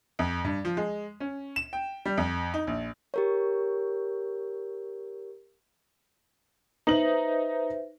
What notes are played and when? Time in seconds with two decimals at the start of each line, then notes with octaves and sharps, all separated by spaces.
0.19 F2
0.44 G2
0.65 F3
0.77 G#3
1.20 C#4
1.56 E7
1.73 G5
2.05 G3
2.17 F2
2.54 D#4
2.67 A#1
3.14 G4 A#4 C#5
6.87 D#4 B4 C5 E5 F#7